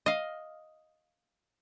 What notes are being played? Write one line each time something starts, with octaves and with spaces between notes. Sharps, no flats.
D#5 F5